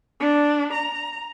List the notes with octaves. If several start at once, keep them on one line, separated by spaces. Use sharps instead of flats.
D4
A#5